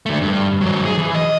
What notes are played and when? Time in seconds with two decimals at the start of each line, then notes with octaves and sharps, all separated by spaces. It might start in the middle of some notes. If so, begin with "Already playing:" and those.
0.06 D3 A3
0.21 G2
0.61 D#3 F#3
0.85 G#4
0.98 E3
1.15 D#5